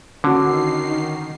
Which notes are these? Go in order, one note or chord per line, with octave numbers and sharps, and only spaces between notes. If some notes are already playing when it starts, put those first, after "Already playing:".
D3 D#3 C#4 F#4 C7